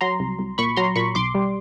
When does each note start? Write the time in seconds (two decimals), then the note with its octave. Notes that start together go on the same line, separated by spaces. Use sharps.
0.01 F#3 A#5 C6
0.20 C2
0.39 C2
0.58 A#2 B5 C#6
0.77 F#3 A#5 C6
0.96 A#2 B5 C#6
1.15 B1 C6 D6
1.35 G3